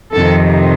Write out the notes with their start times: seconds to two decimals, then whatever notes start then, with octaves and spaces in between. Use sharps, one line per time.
0.13 F2 C3 D#3 A4